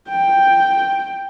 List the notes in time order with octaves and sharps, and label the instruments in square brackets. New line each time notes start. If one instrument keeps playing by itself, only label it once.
[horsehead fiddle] G5